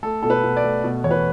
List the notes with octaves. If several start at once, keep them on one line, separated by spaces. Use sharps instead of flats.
A3 A4
B2 A4
B4
B2
D5
A3
B2
E2 C#5
B4